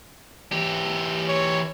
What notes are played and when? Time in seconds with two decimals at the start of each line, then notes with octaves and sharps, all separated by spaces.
0.52 E3 G4
1.29 C#5